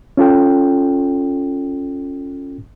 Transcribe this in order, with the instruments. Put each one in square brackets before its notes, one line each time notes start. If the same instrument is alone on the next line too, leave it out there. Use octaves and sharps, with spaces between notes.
[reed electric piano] C#4 F4 A4 G5